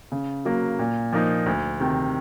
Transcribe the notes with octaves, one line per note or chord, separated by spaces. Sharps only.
C#3
F#3 A#3
A#2
F3 A#3 D#4
D2
C3 D#3